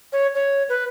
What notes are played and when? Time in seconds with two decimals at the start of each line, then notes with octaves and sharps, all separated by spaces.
0.13 C#5
0.35 C#5
0.69 B4